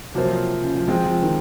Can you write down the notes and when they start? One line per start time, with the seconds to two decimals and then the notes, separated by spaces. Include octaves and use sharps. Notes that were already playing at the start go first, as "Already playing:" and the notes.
0.14 C3 F3 F#3 A#3 F4 C5
0.63 C#3
0.75 F3
0.88 F3 G#3 C4 F4
1.06 F3
1.23 D#3